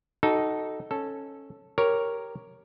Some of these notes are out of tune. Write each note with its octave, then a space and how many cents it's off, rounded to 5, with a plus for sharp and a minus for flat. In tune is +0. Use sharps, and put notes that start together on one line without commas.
D#4 +0 F#4 +25 A4 -5
C#4 -15 A4 +0
G4 +0 A#4 +0 C#5 +0